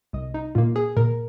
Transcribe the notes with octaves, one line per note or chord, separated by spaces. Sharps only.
C2 D#5
D#4
A#2 A#3 F4
G#4
A#2 A#4